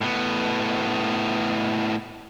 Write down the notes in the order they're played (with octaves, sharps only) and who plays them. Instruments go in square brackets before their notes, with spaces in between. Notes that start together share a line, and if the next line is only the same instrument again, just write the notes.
[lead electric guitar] A2 B3